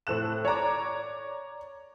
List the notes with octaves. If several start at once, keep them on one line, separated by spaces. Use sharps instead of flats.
A2 C4 A4 F#6 E7
C#5 D5 A#5 D6